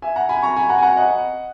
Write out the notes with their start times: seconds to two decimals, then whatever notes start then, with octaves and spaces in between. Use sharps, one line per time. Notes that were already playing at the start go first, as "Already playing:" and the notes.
0.02 E5 G#5
0.16 F#5 A#5
0.29 G#5 B5
0.42 A#5 C#6
0.56 G#5 B5
0.69 F#5 A#5
0.78 G#5
0.82 F#5 A#5
0.97 D#5 F#5